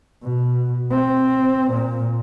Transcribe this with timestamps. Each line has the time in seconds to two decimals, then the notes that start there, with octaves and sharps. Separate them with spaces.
0.23 B2
0.91 C4
1.71 A#2